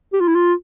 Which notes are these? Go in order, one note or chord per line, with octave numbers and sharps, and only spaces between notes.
G4
F4
E4
F4